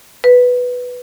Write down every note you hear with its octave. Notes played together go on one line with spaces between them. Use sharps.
B4